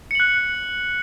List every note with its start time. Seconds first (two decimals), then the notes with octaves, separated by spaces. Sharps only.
0.11 C#7
0.15 F#7
0.20 F#6